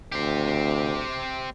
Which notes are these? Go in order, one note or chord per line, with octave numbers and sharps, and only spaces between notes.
D2 C4 G4